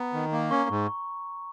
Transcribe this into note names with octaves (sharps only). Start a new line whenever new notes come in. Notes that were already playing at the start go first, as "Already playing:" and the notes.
Already playing: B3 A#5
D#3
A#3
C#4 C#6
G#2